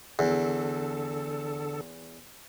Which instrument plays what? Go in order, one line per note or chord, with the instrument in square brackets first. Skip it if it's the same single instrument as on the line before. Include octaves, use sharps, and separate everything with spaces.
[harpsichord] E2 [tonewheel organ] D3 A4